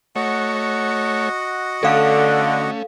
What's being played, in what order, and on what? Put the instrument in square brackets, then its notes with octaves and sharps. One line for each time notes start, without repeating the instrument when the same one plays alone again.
[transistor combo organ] A3 C#5 [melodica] F#4 D#5 F#5
[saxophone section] D3 [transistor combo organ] A3 C#4 [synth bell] A4 F5